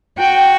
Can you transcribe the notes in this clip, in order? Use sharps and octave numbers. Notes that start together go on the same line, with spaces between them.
F#4 G5